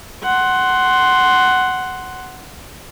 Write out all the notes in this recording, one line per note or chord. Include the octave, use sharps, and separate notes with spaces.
F#5 C6